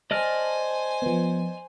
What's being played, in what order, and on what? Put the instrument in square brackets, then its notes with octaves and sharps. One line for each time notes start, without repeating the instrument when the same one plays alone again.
[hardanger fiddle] C5 G#5 [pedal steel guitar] D5 D#5 F6 [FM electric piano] A5
[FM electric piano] F3 B3